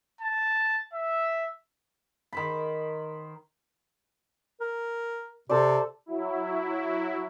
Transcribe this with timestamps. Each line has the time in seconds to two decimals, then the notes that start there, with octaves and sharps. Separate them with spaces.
0.21 A5
0.93 E5
2.33 D#3 C5 B5
4.61 A#4
5.49 C3 A4 C5 D5
6.06 F#3 E4